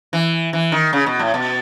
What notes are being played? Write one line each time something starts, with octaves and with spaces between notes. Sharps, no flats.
E3
E3
D#3
C#3
B2
A2
B2